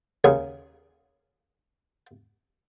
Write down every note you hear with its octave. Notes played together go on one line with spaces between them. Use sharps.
D#2 C#3 G#4